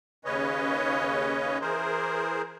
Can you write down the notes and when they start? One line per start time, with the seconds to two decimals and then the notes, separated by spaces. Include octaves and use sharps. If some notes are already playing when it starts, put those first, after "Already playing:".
0.25 D#2 C#3 C#4 B4 C#5 D#5
1.61 E3 G#4 A#4 C5